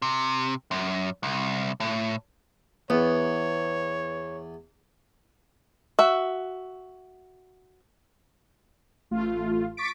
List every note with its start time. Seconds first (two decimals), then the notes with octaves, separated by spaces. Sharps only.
0.02 C3
0.71 F#2
1.23 C2
1.80 A2
2.90 E2 B3 C#5
5.99 F#4 E5
9.11 A1 A3 F4
9.77 C#6 D6 A6 B6 D7